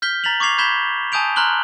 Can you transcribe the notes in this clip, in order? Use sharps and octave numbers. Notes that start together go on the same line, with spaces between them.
F6 G6 B6 G7
A#5 A6 B6 F7 F#7
C#6 D6 G#6 C7 F7
B5 G6 G#6 B6 E7 G7
G#5 A5 D#6 G6 D7 F7
A#5 C6 F6 F#6 F#7 G7